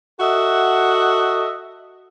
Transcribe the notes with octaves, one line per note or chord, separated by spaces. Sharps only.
F#4 A4 D#5 E5 F#5